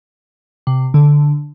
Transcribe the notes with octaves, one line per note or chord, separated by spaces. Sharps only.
C3
D3